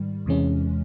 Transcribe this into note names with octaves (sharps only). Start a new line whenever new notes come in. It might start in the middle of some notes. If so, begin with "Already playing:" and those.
Already playing: G#2 D#3 G3
E2 C3 E3 G#3 C#4